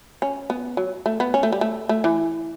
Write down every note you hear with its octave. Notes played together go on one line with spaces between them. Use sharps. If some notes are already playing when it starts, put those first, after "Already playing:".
C#4
B3
F#3
A3
B3
C#4
A3
G3
A3
A3
E3